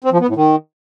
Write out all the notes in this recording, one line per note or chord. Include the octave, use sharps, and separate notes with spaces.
C4
F3
B3
A2
D#3